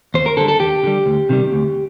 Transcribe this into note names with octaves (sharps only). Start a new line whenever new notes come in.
D#2 C5
A#4
D3 G3 A4
A4
D#2 G4
D3 G3
D2
C3 D#3 G3
D2